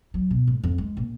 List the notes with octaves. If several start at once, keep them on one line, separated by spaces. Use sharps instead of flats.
F#3
B2
G#2
F2
G#3
A#1